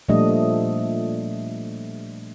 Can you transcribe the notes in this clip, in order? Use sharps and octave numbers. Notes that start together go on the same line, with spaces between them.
A#2 F3 G3 A3 D4 D#5